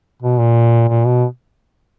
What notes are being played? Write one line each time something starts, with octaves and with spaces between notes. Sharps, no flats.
B2
A#2
A#2
B2